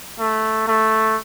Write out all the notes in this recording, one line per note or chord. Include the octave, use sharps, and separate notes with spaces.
A3
A3